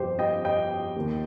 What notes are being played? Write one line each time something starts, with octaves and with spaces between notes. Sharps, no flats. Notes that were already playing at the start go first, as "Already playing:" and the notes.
Already playing: G1 F2 C3 G4 C5
D#5 G5
D#5 G5
D#2 D#3